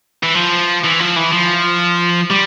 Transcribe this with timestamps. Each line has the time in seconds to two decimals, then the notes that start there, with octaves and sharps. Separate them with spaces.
0.23 E3
0.35 F3
0.84 E3
1.00 F3
1.16 E3
1.32 F3
2.30 G3